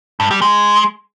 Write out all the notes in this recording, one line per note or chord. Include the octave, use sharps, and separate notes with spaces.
G2
G3
G#3